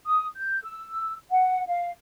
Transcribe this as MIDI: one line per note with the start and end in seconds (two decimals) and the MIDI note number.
0.06 0.25 87
0.37 0.62 91
0.64 1.14 88
1.30 1.63 78
1.67 1.89 77